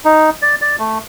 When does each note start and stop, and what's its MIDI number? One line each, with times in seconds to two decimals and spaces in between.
0.05 0.30 63
0.42 0.55 74
0.61 0.76 74
0.79 0.99 57